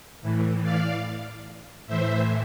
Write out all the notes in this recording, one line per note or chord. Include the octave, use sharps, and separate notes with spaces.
A2 E3
D5 F5
A2 E3 C5 E5